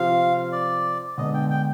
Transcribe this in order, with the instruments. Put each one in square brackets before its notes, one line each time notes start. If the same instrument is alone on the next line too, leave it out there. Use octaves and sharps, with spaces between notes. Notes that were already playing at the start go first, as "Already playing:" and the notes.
Already playing: [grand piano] C3 F3 C4 [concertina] F5
[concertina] D5
[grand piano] D3 G#3 B3 D4 [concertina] D#5
[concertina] G5
G5